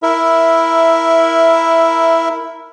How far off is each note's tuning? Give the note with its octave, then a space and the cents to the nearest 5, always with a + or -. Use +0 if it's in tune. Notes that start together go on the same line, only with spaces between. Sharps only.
E4 +0 A#4 +0 E5 +5